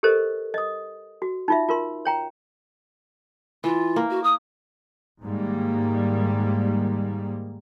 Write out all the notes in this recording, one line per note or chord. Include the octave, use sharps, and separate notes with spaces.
G4 A4 A#4 C5 D#5
D#5 D#6
F#4
D#4 F4 E5
F4 A#4 C6
C#5 G5 A#5
E3 F4
A#3
F#4
D#6
G#2 D#3 G3 A#3